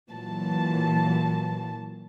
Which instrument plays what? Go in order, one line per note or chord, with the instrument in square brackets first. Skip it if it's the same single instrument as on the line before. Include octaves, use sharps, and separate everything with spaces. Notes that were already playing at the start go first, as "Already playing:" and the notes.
[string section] A#2 E3 F#3 A5